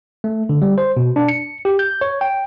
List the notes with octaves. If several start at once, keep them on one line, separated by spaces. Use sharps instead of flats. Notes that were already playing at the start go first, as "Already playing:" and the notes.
A3
D3
G3
C5
B2
D4
C#7
G4
G6
C#5
G5